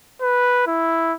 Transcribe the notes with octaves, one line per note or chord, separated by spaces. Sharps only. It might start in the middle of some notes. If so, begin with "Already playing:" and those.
B4
E4